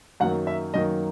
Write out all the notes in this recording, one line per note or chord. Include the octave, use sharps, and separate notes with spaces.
F#2 D#3 F#3 A#3 F#5
E5
F#2 D#3 F#3 A#3 D#5